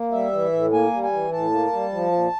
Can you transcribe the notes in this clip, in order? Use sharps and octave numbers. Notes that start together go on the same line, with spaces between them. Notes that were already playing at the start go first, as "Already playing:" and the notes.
Already playing: A#3
G3 E5
E3
A2
A#3 G#5
G3
G#5
E3
A2 A5
A#3
G3
F3
A#2